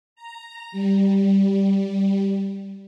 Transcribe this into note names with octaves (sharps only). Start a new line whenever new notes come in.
A#5
G3